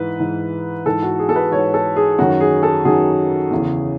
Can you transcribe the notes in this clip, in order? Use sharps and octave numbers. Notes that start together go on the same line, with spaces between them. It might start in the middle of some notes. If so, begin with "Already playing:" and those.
Already playing: G#2 E3 B4
G#2 E3
G#2 E3 A4
F#4
G#4
A4
B4
G#2 E3 C#5
A4
G#4
F#2 D#3 F#3 F#4
G#4
A4
F#2 D#3 F#3 G#4
E2 C#3 E3